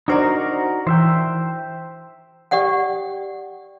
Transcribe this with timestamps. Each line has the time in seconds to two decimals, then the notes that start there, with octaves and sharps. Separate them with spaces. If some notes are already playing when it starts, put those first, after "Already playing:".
0.08 D4 D#4 F#4 A#4 C5 D5
0.87 E3 C5 E5 G5
2.51 G4 D5 F#5 G5